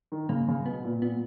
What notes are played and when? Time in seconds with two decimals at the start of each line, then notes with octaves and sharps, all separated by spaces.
0.12 D#3
0.29 C#3 A#3
0.48 C#3
0.66 B2 B3
0.84 A#2
1.02 A#2 B3